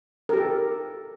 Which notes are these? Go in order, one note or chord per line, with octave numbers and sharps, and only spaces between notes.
G4 A4 A#4